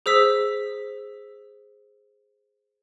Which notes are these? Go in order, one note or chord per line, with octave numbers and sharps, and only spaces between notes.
G#4 C5 E6 B6